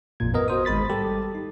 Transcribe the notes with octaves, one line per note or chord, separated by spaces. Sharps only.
A1 F2 A#2 G#6
B3 A#4 D#5
F#4 C5 D#6
G#1 G#3 B5 A6 B6
G3 G4 A4
D#4